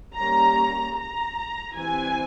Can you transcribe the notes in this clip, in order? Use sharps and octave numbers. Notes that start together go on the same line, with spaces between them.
G3 A#3 C#4 A#5
A#5
E3 G3 C4 G#5